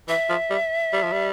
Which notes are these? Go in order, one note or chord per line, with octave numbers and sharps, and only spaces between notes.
E3 E5
F3
G3
G3
F3
G3